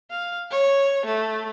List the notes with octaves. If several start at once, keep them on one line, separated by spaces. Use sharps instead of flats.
F5
C#5
A3